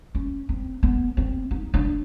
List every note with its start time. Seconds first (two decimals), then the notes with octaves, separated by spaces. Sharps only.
0.15 C#4
0.49 C4
0.83 B3
1.17 C4
1.51 D#4
1.74 D4